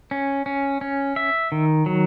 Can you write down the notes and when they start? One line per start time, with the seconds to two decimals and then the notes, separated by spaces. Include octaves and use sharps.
0.11 C#4
0.46 C#4
0.81 C#4
1.16 E5
1.52 D#3
1.86 F#3